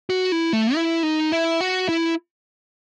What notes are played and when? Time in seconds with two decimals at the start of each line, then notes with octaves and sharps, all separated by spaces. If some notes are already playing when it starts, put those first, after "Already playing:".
0.10 F#4
0.32 E4
0.53 A3
0.75 E4
1.03 D#4
1.32 E4
1.61 F#4
1.89 E4